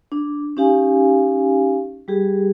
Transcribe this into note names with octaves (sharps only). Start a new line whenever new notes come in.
D4
C#4 D#4 G4 F5 G#5
G3 G4 G#4